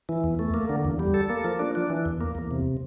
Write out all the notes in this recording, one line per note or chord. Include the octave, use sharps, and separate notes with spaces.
E3
E2
A3
A#3
D3
E2
G3
A4
A#3
F3
D4
D4
E3
E2
A#3
E2
C3